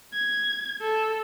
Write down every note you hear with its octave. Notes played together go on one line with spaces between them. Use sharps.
G#6
A4